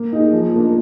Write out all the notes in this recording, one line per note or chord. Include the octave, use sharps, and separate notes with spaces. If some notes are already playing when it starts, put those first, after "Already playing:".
Already playing: A#3
D#4 G#4
F3
A#3 D4